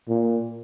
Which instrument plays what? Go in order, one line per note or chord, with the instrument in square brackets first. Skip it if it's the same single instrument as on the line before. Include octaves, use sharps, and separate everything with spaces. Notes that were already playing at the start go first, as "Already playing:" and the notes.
[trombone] A#2